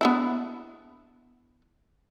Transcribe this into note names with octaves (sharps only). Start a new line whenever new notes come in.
B3 D4 E4